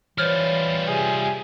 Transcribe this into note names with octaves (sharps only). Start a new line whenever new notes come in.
E3 G3 F4 C5 C#5 F6
C3 G#4